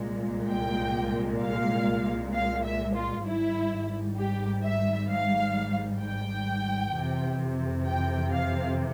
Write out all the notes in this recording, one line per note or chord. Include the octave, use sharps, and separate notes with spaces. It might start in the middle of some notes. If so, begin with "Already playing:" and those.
Already playing: C2 A#2 G#3
G5
F5
F5
E5
F4
G#1 G#2 G3 E4
G4
E5
F5
G5
F2 C3 E3
G5
F5